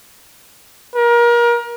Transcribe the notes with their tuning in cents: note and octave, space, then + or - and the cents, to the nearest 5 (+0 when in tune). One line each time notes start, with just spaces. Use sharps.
A#4 +30